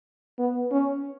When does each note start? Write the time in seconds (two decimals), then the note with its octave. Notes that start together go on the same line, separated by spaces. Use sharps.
0.39 B3
0.72 C#4